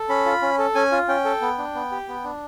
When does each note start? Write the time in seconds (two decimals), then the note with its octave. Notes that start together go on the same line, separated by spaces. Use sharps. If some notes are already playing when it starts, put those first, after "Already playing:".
Already playing: A4
0.09 C#4 B5
0.26 F4
0.42 C#4
0.59 A4
0.75 C#4 G#5
0.92 F4
1.08 C#4 G5
1.25 A4
1.41 B3
1.58 D4
1.75 B3
1.91 G4
2.08 B3
2.24 D4